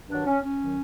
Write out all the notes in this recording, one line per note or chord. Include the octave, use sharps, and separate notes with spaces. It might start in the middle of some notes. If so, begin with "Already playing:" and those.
G2 D#3 F#3 D4
C#4
C#4
D#3 F#3